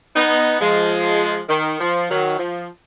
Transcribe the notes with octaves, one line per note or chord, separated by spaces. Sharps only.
B3 D#4
F3 G#3
D#3
F3
D#3 F#3
F3